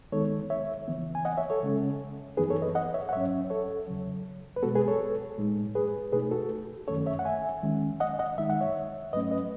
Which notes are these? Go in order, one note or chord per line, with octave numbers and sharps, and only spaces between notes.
D#3 G#3 B3 D#4 A4 C#5
C#5 E5
C#3 E3 B3
G#5
D#5 F#5
C#5 E5
A4 C#5
C#3 G#3 C#4
F#2 E3 B3 D#4 G#4 B4
A4 C#5
B4 D#5
D#5 F#5
C#5 E5
F#5
G#2 F#3 C#4 C#5 E5
A4 C#5
E2 C#3 F#3
B4
B2 G#3 B3 F#4 A4
G#4 B4
A4 C#5
A2 G#3 D#4
G#4 B4
B2 A3 D#4 G#4 B4
F#4 A4
F#2 D#3 A3 C#4 A4 C#5
C#5 E5
F#5
E5 G#5
D#3 G#3 C#4
D#5 F#5
D#5 F#5
D#3 G#3 D#4 E5
F#5
C#5 E5
G#2 F#3 A3 C#4 B4 D#5
B4 D#5